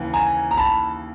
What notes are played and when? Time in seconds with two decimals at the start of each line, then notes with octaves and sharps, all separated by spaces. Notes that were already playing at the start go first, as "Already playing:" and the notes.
Already playing: D#2 C#3 E3
0.14 G#5 A#5
0.51 A#5
0.57 A5 B5